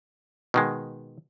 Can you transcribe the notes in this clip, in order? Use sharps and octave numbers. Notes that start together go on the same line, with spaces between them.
B2 D#3 G#3